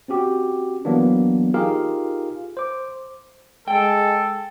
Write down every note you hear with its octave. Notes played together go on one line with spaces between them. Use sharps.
C4 C#4 F#4 G4
E3 F#3 A#3 B3 D4
D#4 F4 G4 G#4 A#4 F5
C5 D6
G#3 A4 G5